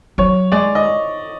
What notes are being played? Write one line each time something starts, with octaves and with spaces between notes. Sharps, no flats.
F#3 C#5
G#3 D5
D#5